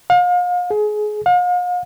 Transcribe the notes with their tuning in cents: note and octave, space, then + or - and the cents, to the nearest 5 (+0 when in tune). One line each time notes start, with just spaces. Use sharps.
F5 +40
G#4 +25
F5 +45